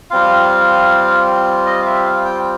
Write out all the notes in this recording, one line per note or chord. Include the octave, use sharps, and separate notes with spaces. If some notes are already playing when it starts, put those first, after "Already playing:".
G3 C4 F4 F5
D#5
F5
E5
F5
G5